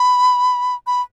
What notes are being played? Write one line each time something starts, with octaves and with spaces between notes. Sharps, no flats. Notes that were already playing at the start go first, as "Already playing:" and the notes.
Already playing: B5
B5